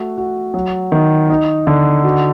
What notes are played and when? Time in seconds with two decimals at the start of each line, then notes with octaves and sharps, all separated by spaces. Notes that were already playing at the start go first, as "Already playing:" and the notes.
Already playing: A3 F#4
0.17 F#4
0.54 F#3
0.92 D#3
1.29 D#4
1.67 D3
2.04 F#4